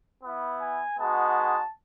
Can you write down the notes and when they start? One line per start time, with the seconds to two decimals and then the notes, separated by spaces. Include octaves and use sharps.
0.22 B3 E4
0.60 G#5
0.99 G#3 B3 D#4 F#4 A5